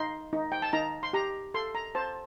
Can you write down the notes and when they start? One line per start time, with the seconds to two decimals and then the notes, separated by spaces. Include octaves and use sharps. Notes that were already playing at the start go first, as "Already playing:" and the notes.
Already playing: D#4 C6
0.33 D#4
0.52 G5
0.62 A5
0.73 D#4 A#5
1.03 C6
1.13 G4 A#5
1.54 A4 C6
1.75 A#5
1.95 C5 A5